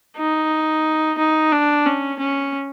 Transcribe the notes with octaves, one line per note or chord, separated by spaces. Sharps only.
D#4
D#4
D4
C#4
C#4